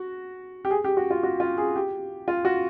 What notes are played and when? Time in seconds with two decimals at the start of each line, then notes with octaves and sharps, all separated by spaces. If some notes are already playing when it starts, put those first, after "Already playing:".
Already playing: F#4
0.65 G4
0.71 G#4
0.84 G4
0.97 F#4
1.10 F4
1.23 F#4
1.40 F4
1.58 G#4
1.76 G4
2.28 F4
2.45 F#4